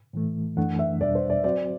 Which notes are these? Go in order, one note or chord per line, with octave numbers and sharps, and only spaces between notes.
A2 E3 A3
F#2 E3 A3 D4 F#5
E5
E2 B2 G3 D4 D5
C5
D5
F#3 C4 F#4 C5 D5